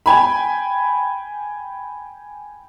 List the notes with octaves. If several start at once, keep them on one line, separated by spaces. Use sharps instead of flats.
G5 G#5 B5